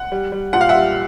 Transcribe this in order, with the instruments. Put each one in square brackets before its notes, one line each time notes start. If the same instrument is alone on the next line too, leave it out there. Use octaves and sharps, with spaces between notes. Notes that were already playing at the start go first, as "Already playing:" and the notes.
Already playing: [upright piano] F#5
G3
G3
A#2 F#5
F5
E5 F#5
G3